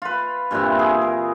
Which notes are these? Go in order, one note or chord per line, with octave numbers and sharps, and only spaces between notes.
F4 B4
G2 A#2 E3 C4
G#4
A#4